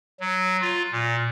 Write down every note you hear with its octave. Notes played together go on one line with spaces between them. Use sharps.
F#3
F4
A#2